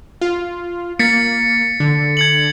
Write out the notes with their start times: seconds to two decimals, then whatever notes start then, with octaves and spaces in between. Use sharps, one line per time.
0.21 F4
0.99 A#3 A6 B6 C#7
1.80 D3
2.17 G#6 C#7 F#7